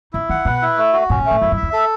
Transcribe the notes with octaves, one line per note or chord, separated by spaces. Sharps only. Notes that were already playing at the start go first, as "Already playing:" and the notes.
C#3 E4
D#3 F#5
B2 B4
E4
A3
F#4
A2 C#4
B2
A3
A2
F#2 E4
F#2
E5
E2
A4